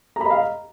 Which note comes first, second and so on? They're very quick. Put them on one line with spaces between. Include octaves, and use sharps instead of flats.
A#5 B5 D#5 F5